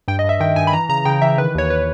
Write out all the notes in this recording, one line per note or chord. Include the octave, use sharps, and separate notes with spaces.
G2 G5
D#5
G2
E5
D#3 G5
G2 G#5
B5
E3 A#5
C#3 A#5
C#3 G5
E3 E5
D#3 B4
D#2 C#5
B4